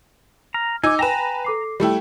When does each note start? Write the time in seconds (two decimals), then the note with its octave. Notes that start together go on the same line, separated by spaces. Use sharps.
0.54 A#5 F6
0.83 D#4 G#5 D6 E6
0.99 B4 G5 G#5 A#5 A#6 E7
1.45 A4 D6 C7
1.80 G3 A3 E4 G4 G5